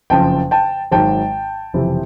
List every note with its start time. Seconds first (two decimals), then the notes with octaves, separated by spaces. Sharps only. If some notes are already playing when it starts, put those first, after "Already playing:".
0.10 F#1 F2 C#3 F3 G5 A5
0.51 G5 A5
0.92 G#1 G#2 D#3 F#3 G5 A5
1.74 F#1 F2 C3 E3